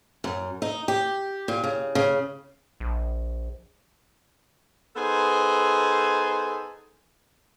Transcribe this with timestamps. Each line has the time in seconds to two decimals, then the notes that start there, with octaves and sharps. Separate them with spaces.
0.24 F#2
0.62 D#4
0.88 G4
1.48 A#2
1.64 C#3
1.95 C#3
2.80 A#1
4.95 B3 D#4 G#4 A4 C5